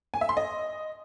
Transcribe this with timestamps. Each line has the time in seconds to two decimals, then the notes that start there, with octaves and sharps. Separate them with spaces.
0.14 G#5
0.21 E5
0.29 C6
0.37 D#5